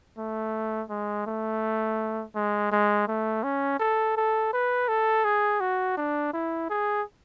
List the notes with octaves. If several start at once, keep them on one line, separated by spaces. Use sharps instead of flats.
A3
G#3
A3
G#3
G#3
A3
C#4
A4
A4
B4
A4
G#4
F#4
D4
E4
G#4